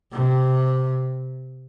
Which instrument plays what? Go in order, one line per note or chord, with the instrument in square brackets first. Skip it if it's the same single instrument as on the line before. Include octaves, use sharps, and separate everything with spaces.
[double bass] C3